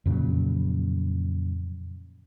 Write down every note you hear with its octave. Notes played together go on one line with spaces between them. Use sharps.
F2 A#2 C#3 F#3